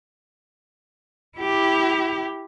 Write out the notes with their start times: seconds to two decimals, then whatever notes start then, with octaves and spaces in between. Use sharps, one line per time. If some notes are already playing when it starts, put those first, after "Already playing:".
1.38 E4 G4